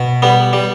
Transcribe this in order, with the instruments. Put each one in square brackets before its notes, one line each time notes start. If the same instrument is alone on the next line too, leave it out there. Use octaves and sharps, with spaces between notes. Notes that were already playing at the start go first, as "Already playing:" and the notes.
Already playing: [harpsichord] B2
G3 B3
G3